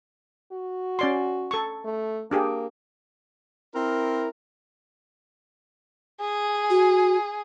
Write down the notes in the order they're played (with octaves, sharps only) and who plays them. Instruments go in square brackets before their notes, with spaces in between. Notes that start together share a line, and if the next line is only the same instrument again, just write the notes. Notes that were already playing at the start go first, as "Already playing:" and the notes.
[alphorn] F#4
[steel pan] C#4 D5 C6
A4 C#6
[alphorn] A3
[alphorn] A#3 [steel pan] D4 G4 G#4
[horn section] C4 E4 A#4
[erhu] G#4
[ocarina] F#4